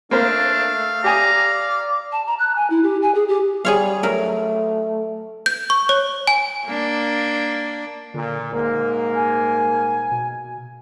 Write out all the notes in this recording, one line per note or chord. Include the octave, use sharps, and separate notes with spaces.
A3 A#3 D4 C5 F5
G4 D5 G#5 A#5 D#6
A5
A#5
F#6
G#5
E4
G4
G#5
G#4
G4
G3 G#4 C#5 F5
F#3 A3 A#4
G6
C#6
C#5
G#5
A#3 D4
A#2 D3
D#1 G#2 A#3
G#5
B2